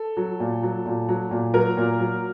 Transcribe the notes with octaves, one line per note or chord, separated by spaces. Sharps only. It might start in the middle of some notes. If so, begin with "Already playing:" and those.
Already playing: A4
F#3
A#2
F#3
A#2
F#3
A#2
F#3 A#4
A#2
F#3